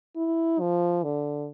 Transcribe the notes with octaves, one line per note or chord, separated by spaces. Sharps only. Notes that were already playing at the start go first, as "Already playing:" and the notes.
E4
F3
D3